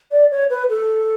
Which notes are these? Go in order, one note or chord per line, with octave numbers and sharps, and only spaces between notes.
D5
C#5
B4
A4